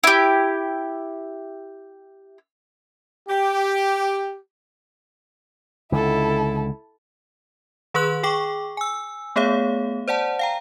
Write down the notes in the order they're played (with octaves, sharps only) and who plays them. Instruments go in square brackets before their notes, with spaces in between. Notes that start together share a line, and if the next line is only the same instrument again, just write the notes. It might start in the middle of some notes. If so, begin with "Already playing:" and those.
[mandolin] E4 G4
[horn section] G4
[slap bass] C#2 D3 [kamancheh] E4 A4
[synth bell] D#3 G#4 B4 C6 F#6 F#7
G#4 G5 C#6 D6
G#5 E6
A3 B3 G#4 C#5 F5
C5 D5 F#5 A5
F5 G5 A#5